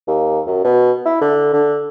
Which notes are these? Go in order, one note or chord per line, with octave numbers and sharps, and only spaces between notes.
D#2
F#2
B2
E4
D3
D3